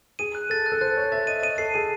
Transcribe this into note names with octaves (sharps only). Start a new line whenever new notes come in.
G#4 D#7
F#6
A4 A6
F#6
A4
C5 F#6
C#5 A6
E5 A6
D#5 D#7
D#5 D#7
A4 C7
G#4 D#7